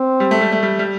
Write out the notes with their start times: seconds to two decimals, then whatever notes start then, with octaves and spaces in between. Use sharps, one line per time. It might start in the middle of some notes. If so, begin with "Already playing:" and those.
Already playing: C4
0.20 G3
0.31 A3
0.41 G3
0.52 A3
0.63 G3
0.79 G3